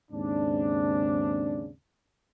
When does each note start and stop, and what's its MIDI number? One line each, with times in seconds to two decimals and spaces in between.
0.11 1.70 39
0.11 1.70 44
0.11 1.70 49
0.11 1.70 60
0.11 1.70 62